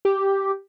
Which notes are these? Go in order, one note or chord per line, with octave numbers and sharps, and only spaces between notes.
G4